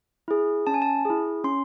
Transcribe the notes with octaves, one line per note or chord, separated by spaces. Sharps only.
E4 G#4
C#4 A5
G#5
A5
E4 G#4
C#4 C6